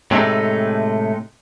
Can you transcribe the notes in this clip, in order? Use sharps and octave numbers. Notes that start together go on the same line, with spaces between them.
A2 C3 G#3 A3 D4 D#4